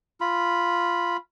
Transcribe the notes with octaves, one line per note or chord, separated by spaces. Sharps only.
F4 B5